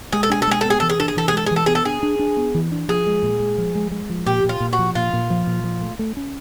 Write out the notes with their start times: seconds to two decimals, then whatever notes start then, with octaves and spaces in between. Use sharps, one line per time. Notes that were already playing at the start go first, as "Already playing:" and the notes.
0.13 G#3 G#4
0.23 A4
0.30 D4 G#4
0.42 A4
0.47 G#3 G#4
0.61 A4
0.65 B3 G#4
0.80 E3 A4
0.90 G#4
1.00 D4 A4
1.08 G#4
1.17 E3 A4
1.28 G#4
1.33 G#3 A4
1.46 G#4
1.51 E3
1.56 A4
1.66 B3 G#4
1.75 A4
1.85 D4 G#4
2.03 D4
2.19 D4
2.37 B3
2.55 E3
2.71 D4
2.88 F3 G#4
3.07 G#3
3.23 A#2
3.40 G#3
3.58 F3
3.75 G#3
3.91 G#3
4.10 F3
4.26 A#2 G4
4.44 A#2 F4
4.60 A#2
4.73 F#4
4.79 F3
4.95 A#2 F4
5.13 A#2
5.30 F3
5.47 A#2
5.64 F3
5.81 A3
5.99 A3
6.17 C#4